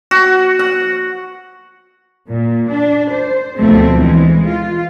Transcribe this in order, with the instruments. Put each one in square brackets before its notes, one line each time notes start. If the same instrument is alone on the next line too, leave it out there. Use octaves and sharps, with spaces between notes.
[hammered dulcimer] F#4
F#5
[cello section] A#2
D4
C5
D2 B2 F3 A3 C4
E3 G#3
F4